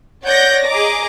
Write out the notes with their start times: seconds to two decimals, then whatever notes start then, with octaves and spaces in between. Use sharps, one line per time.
0.24 C#5 D5 F#5 G6 A#6
0.67 G#4 D#5 A#5 D6